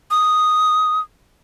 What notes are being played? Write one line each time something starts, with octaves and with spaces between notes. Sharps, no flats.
D#6